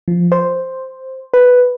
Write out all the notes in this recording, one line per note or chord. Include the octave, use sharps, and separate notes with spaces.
F3
C5
B4